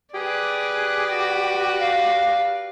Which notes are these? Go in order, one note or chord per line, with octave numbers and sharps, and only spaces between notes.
G4 G#4 B4 D5
F#4
F5